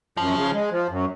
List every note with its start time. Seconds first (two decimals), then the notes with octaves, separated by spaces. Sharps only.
0.17 F#2 F3
0.36 C#3
0.54 G#3
0.71 F3
0.89 F#2